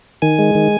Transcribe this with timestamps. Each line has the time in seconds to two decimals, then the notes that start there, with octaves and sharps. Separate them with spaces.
0.22 D#3 G#5
0.39 G#3
0.55 D#3